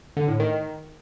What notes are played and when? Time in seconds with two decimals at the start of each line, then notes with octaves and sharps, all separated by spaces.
0.17 D3
0.28 A2
0.40 D#3